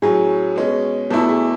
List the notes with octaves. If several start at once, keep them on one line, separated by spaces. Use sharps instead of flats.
A2 F#3 C#4 G#4
B2 G#3 C#4
E2 B2 A3 E4 A4
G#4